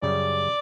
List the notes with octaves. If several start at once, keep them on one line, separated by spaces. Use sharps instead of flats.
F#2 C#3 G3 D5